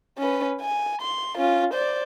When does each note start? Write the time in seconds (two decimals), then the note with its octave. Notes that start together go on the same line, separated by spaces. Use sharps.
0.18 C#4 B4
0.61 G#5
1.01 C6
1.38 C#4 F4
1.74 C5 D5